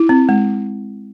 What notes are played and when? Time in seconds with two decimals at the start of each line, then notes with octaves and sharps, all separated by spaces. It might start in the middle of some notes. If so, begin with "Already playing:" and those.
Already playing: E4
0.09 C4
0.29 G#3